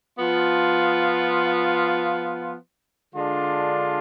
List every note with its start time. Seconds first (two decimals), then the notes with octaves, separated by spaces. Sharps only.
0.19 F3 B3 F4
3.14 D3 G#3 D4 F4